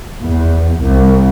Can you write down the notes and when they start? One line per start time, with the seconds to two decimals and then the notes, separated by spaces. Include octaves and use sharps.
0.22 E2
0.82 C2